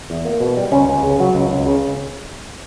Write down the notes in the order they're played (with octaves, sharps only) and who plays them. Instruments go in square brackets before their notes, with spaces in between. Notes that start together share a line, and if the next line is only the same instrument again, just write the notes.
[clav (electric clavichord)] E2
A#3
B2
G3
C#2 C#4
C#2
C#3
F#3
C#2
C#2
C#3